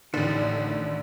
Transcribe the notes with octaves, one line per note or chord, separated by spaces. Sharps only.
A1 A2 D3 D#3 D5